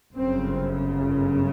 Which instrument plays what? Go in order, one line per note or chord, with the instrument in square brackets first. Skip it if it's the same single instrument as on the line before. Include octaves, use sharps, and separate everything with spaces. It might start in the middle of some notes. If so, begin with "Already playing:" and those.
[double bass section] G1 F#2 C#3 C4